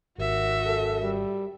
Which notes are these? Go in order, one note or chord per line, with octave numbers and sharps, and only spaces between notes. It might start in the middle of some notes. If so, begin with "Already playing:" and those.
G#1 D#2 F#4 E5
F#2 A4
G3